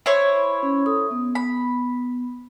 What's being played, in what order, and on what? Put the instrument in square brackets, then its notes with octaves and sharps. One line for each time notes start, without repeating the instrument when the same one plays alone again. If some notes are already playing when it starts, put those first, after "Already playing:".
[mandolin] E4 C5 C#5
[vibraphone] C#4
A4 D#6
B3
[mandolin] B5